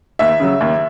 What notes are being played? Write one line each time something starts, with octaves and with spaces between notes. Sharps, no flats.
D#2 E5
C#3 F#3
D#2